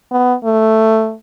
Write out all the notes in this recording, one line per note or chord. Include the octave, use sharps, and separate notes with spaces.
B3
A3